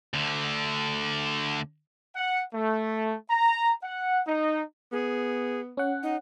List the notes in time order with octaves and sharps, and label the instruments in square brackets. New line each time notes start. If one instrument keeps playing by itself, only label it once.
[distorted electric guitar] D2 D3
[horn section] F#5
A3
A#5
F#5
D#4
[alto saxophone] B3 [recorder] G#4
[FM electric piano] C#4 F#5
[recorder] D#4